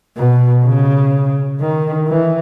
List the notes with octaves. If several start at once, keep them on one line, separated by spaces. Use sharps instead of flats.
B2
C#3
D#3
E3